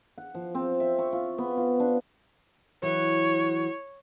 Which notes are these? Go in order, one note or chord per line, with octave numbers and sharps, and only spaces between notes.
F#5
F3
C4
E5
C#6
F4
B3
F4
D4
E3 F#3 C#5